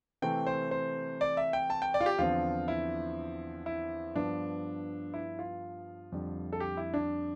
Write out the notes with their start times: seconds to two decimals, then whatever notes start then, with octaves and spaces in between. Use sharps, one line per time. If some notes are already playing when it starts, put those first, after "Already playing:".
0.22 C3 E3 A3 C4 G5
0.47 C5
0.71 C5
1.21 D5
1.37 E5
1.53 G5
1.70 A5
1.82 G5
1.94 D5
2.01 F4
2.06 G4
2.18 E2 D3 F3 C4 F4
2.68 E4
3.66 E4
4.15 G2 F3 B3 D4
5.14 E4
5.39 F4
6.12 F2 D3 G3
6.53 A4
6.60 G4
6.77 E4
6.94 D4